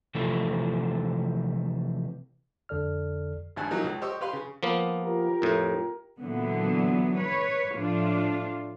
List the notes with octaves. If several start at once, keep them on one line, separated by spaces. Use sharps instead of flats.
C3 E3 F3 A3
F2 D3 A4 D5 F6
G#1 G2 G#5 A5 F#6
E3 F#3 A#3 D#4 G4
C#2
G4 C5 D#5 C#6 D#6 E6
G4 B4 F5 C6
C#3
F3 A#3 B3
F4 G4 A#4
F2 A2
A#2 D3 E3 F#3 B3
B4 C#5
A2 F3 D4 F4